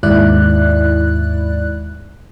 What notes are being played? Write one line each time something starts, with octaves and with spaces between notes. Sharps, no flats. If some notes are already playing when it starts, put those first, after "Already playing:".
D#2 G#2 E4 D5 F#6